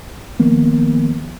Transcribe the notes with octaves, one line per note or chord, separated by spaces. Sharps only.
D#3 F3 A#3 B3